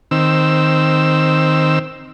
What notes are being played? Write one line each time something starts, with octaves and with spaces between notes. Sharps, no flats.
D#3 C4 E6